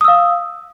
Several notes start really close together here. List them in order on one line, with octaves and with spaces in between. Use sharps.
D#6 E6 F5